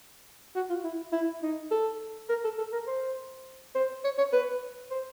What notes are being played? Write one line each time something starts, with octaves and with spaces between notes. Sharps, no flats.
F#4
F4
E4
E4
D#4
A4
A#4
A4
A4
A#4
C5
C5
C#5
C#5
B4
C5